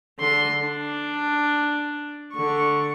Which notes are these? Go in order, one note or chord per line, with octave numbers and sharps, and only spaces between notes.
D3 C6
D4
D3 C#6